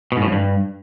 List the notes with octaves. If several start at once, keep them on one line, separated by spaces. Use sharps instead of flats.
B2
G#2
A2
F2
G2